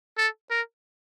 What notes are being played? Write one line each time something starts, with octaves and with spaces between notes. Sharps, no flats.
A4
A#4